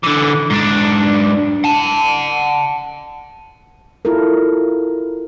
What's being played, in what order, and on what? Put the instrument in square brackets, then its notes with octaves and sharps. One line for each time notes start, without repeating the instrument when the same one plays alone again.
[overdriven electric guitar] D3 E3
G#2 D4
F#5 A5
[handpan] E4 F4 A4 A#4